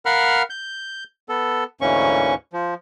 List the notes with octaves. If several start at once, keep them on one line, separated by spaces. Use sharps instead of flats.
A#4 F5 F#5 B5 F6
G6
B3 A4
D2 G#2 E3 A#3 C#4 C#6
F3